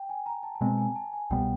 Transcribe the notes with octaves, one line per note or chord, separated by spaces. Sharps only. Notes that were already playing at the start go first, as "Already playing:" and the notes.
Already playing: G5
G#5
A#5
A5
A5
B2 G#3 C4 G#5
G#5
A5
G#5
C2 B2 G3 B3 G5